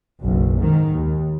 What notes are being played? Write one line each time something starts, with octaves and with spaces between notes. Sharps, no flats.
F#1 B1
G#2 D#3
D#2